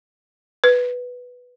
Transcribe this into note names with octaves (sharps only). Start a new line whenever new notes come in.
B4